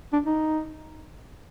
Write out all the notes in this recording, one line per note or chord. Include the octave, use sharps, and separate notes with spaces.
D4
D#4